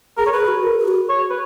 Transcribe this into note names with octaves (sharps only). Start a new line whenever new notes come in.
G#4 A#4
C#5
G#4 B4
F#4
A#4
G#4
F#4
C#5
B4